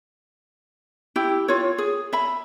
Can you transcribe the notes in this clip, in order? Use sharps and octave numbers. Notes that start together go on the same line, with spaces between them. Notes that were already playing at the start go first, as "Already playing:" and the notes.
E4 G4
F4 C#5
G#4
E5 B5